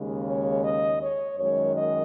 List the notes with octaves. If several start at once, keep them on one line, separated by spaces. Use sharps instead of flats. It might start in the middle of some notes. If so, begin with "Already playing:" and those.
Already playing: D#2 C#3 G#3
C#5
D#5
C#5
F#2 D#3 G#3 C#5
D#5